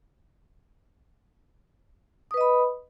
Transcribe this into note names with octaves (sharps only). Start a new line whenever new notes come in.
B4 D#5 B5 D#6